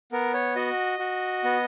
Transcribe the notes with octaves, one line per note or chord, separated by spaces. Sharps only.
B3 A#4
C#5
F#4 D#5
F#4
B3